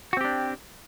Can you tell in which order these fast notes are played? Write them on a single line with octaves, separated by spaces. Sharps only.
F#4 C4 G4 D4